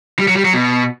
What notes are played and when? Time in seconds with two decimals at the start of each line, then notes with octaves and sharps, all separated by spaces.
0.19 G3
0.28 F#3
0.36 G3
0.45 F#3
0.53 B2